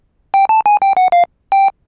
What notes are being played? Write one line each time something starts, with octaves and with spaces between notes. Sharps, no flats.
G5
A5
G#5
G5
F#5
F5
G5